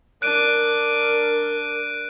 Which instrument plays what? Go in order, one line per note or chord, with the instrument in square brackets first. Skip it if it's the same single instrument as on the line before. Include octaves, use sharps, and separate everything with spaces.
[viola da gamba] D4 [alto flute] A#4 [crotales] F#6 D7 D#7